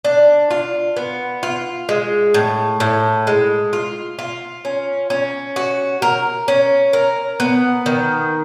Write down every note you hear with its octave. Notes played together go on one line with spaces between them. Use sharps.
D4
F4
B3
F4
G#3
A2
A2
G#3
F4
F4
C#4
C#4
F#4
A#4
C#4
A#4
B3
D#3